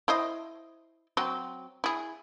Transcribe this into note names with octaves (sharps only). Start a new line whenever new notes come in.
E4 C5 D#5
F#3 C4
E4 G#4